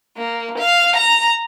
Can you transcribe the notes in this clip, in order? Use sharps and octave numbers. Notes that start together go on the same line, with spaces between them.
A#3
F5
A#5